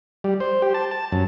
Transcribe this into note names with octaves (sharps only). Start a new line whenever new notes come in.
G3
C5
G4
A5
A5
F#2